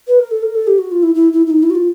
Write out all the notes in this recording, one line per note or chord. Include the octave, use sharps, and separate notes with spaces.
B4
A#4
A4
A#4
A4
G4
F#4
F4
E4
E4
E4
E4
D#4
E4
F#4
F4